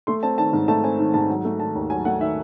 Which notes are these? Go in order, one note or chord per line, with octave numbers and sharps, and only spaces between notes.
A3 C6
C4 A5
D#3 A5
G#2
A3 A5
C4 G#5
D#3
G#2 A5
F#3
A3
D#3 A5
D#2
F#3 G#5
A3 F#5
D#3 E5